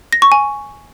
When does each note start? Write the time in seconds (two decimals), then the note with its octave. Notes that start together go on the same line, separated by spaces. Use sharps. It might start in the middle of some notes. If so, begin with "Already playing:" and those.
0.13 A#6
0.22 C#6
0.32 G#5